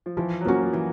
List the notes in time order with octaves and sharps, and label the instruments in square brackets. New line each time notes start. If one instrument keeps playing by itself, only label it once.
[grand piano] F3
[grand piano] E3 [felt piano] F3
[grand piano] F#3
[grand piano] F3 [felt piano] A#3 C#4 F#4
[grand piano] F3
E3